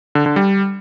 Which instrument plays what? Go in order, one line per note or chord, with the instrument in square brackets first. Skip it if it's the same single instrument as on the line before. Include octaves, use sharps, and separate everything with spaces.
[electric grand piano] D3
D3
G3